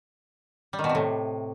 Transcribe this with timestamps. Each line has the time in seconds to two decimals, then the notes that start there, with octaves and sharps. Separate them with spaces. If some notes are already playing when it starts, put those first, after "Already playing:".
0.73 G3
0.79 D#3
0.84 B2
0.89 C3
0.95 A2